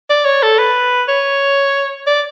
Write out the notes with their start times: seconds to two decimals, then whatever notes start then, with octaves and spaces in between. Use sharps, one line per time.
0.10 D5
0.25 C#5
0.43 A4
0.59 B4
1.08 C#5
2.07 D5